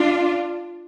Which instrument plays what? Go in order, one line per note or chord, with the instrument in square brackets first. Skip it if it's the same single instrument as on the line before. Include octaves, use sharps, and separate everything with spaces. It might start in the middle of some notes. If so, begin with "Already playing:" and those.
Already playing: [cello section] D4 F4